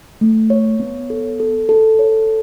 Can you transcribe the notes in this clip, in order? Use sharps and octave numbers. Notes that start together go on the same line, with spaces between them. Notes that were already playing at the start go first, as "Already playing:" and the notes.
A3
C#5
B3
A4
A4
A4
C#5